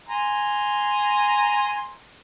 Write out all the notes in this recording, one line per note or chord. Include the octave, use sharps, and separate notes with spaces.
G#5 A#5 C6